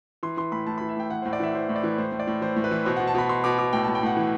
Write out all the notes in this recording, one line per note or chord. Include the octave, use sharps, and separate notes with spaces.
E3 C6
E3 C6
A2 B5
A2 A5
E3 B5
E5
A2 G5
E3 F#5
A2 C5
D5
E3 E5
E3 C5
A2
D5
E3
A2 C5
A2
D5
A2
E3 C5
A2
B4
E3
B2 C5
B2 F#5
A5
B2 B5
B2 C6
B2 D6
B2 D6
A2 G5
A2 A5
G5
A2 F#5
E3